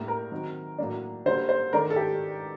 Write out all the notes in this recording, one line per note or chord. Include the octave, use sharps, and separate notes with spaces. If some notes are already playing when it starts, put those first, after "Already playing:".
Already playing: A2 G3 A#3 D4
A#4
D#3 F#3 C4 D#4
A2 F#3 A#3 D4
D3 G3 A#3 C5
C5
D#3 A3 D4 A#4
A4
G4